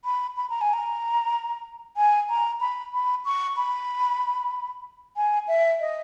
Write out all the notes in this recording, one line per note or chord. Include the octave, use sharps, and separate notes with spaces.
B5
B5
A#5
G#5
A#5
G#5
A#5
B5
B5
C#6
B5
G#5
E5
D#5